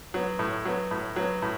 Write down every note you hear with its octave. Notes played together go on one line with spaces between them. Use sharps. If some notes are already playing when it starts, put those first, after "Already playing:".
F#3 B3
A2
F#3 B3
A2
F#3 B3
A2